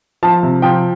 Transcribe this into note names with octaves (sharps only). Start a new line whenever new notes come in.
F3 A5
C3
F3 G5